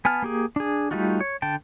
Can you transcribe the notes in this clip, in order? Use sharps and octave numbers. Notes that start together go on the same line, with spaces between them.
B3 G#5 A5 F6
A#3 G4 G#4
D4 G#4
G3 A3 D#4 F4 F#4
C#5
D3 G5 A5